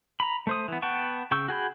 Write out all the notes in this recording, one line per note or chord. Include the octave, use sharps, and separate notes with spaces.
A#5 B5
A3 C5 D#6
E3 B3
B3 F#5 G5 A5 C#6
C#3 G5 C#6 E6
F#4 G#4 G5 B5